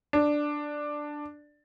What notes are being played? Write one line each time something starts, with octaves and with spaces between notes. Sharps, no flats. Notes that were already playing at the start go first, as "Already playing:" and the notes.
D4